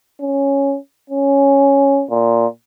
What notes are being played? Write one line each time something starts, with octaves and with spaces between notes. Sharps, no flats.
C#4
C#4
A#2